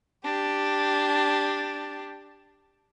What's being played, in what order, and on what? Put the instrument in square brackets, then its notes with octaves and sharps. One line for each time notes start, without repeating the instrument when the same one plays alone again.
[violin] D4 G4